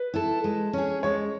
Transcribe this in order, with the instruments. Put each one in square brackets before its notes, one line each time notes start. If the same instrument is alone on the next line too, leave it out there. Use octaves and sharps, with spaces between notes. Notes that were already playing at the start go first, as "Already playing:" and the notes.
Already playing: [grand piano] B4
[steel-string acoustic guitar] E4 A4
G#3
C#4 G#4
[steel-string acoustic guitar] G#3 [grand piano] C#5